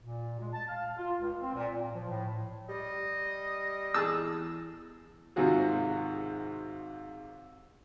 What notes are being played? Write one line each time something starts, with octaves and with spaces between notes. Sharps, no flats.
A#2
G#3
A5
F5
F4
C#2
C4
A#2
A#2
F3
A2
G3 D#5
E2 G#4 A5 E6
G#2 C3 D#3 F4 F#4 G#4